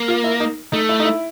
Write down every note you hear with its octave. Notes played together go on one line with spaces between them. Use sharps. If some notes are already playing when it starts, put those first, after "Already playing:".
Already playing: A#3
F4
E4
D#4
A3 D#4
E4
D#4
E4